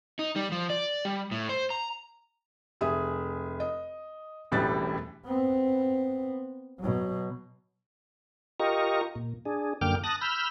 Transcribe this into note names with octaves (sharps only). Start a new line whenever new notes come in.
D#4
G3
F3
D5
G3
A2
C5
A#5
F1 G#4 E5 D#6
D#5
E1 A1 A2 G3 F#6 A6
B3 C4
B2 F#3
F4 G4 A#4 D#5 A#5 C#6
A#2
D4 G#4
F#2 D3 A#3 G5 D6 F6
A5 D#6 F#6 A#6
B5 E6 F6 G6